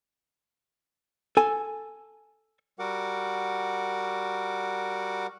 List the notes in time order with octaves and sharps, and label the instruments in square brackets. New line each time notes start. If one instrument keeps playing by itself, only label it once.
[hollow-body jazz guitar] A4 G#5
[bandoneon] G3 F#4 A#4 F#5 D6